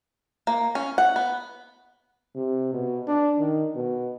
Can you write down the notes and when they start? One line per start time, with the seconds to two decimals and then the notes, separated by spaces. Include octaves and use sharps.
0.47 A#3
0.75 C#4
0.98 F#5
1.16 B3
2.36 C3
2.74 B2
3.07 D4
3.39 D#3
3.75 B2